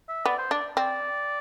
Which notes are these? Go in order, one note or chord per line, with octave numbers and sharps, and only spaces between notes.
E5
B3 D5
C5
D4 D5
C4 D5